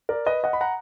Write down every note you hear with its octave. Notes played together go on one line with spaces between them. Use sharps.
A#4 D5
B4 D#5
D#5 F#5
B5
F#5 A#5